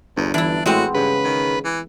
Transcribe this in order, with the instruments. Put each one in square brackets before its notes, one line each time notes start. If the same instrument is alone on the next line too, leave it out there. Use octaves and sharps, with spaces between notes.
[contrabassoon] G1 [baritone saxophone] E2
[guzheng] E3 E4 [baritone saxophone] D4
[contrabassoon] A2 [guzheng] G#3 B3 C4 [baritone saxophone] F#4
[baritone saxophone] G2 [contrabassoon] C#3 [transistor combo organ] B4
[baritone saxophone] D#3
E3